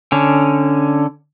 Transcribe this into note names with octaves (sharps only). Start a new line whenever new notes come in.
D3 C#4